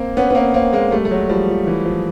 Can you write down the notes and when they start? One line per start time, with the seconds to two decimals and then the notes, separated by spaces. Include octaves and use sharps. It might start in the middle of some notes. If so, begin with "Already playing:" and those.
Already playing: A#3 C4
0.17 B3 C#4
0.30 B3
0.35 A#3 C4
0.54 A#3 C4
0.73 G#3 A#3
0.91 G3 A3
1.05 A3
1.11 F#3 G#3
1.29 F3 G3
1.49 F3
1.67 E3
1.85 F3